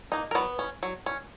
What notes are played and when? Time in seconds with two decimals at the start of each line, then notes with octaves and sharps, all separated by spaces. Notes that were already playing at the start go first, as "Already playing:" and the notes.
0.12 A#3 D#4
0.31 A#4
0.35 F#3 B3 B4
0.59 C#4
0.83 F#3
1.06 C#4